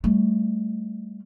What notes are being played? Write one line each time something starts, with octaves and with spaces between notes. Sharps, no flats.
G3 A3